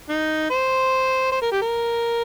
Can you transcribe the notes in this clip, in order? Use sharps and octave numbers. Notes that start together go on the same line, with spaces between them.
D#4
C5
C5
A#4
G4
A#4